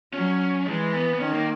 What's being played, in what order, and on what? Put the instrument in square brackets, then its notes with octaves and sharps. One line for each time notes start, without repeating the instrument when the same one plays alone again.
[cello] F#3 [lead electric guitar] C#4
[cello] E3 [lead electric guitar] G#3
[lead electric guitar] B3
B3
[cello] D#3 [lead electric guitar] C#4
[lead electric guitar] A#3